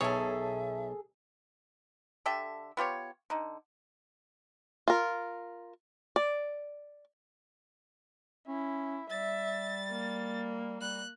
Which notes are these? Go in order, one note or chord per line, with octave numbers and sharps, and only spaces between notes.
B1 G#4 A4 C#5 E5
D3 G4 A4 E5
B3 F4 G4 C#5
D3 D#4
F4 A#4
D5
C#4 E4
G3 E5 A6
A#3
G3 F#6